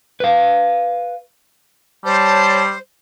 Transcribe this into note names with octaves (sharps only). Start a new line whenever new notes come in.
B4 F5
G3 C5 C#5 A5